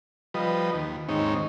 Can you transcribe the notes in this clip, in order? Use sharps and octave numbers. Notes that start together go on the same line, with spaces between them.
F3 G3 B4 D#5
D#2
D#2 G#2 C4 D#4 C#5